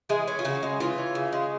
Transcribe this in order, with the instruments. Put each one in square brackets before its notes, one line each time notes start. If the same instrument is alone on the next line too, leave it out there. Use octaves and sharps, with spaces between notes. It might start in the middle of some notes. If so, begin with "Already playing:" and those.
[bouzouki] E3 G#3 G#4
C#4
F4
C#3 F#4
G#3
E3 F4
C#4
C#3
G#3